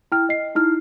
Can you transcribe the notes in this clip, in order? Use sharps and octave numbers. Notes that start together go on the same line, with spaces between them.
E4 G5 F6
D#5 C7
D#4 E4 F6